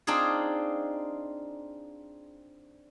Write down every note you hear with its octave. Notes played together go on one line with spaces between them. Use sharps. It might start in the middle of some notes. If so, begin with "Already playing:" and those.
C4 D4 D#4 F4 G#4